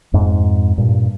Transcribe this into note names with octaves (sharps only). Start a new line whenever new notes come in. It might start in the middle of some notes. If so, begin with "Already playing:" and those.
F2 G#2
G2 A#2